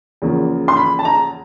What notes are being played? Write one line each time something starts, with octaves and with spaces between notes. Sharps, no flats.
E2 C#3 F3 A#3
C6
B5
A5
A#5